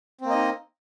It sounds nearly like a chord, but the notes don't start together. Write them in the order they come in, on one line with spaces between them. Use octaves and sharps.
C4 A#3 D#5 D#4